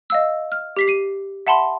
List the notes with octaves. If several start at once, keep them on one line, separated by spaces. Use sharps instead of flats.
D#5 F5 E6
F6
G4 B6 C7
C7 D#7
E5 F#5 A5 B5 C6